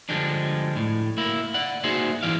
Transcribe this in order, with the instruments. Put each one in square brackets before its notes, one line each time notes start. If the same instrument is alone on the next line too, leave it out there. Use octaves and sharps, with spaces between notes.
[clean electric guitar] D3 F3 G3 G#3 D4
A2
A#3 E4
D5 F#5
A#3 D#4 F#4 G#4 C5 E5
G2 E3 E4 D5 F5